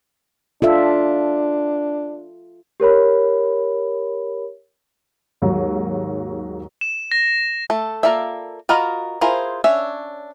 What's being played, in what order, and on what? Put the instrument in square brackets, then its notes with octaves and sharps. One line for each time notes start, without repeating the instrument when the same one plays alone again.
[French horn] D4 [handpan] F4 A4 E5
[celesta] G4 A#4 C#5 B5
[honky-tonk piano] D#2 G#2 F#3
[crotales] E7
A#6
[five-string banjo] A3 A4
A#3 F4 A4 D5 E5
F4 F#4 A#4 D#5 B5
E4 F4 G#4 A#4 C5
C#4 D4 C#5 E5